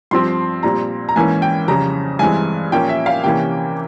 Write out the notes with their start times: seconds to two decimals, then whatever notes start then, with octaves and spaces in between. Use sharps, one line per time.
0.11 G2 F3 C4 C6
0.63 A#2 G3 C4 A#5
1.09 A#5
1.16 G#2 E3 A#3 C#4 G#5
1.42 G5
1.68 F2 C#3 G3 C#4 A#5
2.19 G2 E3 G#3 C4 G#5
2.72 A#2 F3 A#3 C#4 G5
2.89 E5
3.06 F5
3.24 C3 E3 A#3 C#4 G5